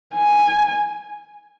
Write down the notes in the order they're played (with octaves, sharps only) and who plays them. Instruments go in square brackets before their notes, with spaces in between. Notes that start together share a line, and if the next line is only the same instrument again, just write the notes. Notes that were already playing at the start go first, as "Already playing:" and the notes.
[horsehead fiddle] G#5